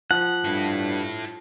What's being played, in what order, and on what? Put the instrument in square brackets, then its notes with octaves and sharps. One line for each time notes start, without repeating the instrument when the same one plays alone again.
[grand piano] F3 [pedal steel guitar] F#5
[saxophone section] G2 [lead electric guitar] E4 A4